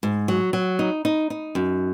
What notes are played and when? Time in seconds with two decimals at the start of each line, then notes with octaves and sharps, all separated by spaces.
0.03 G#2
0.28 F#3
0.53 F#3
0.79 D#4
1.05 D#4
1.30 D#4
1.55 F#2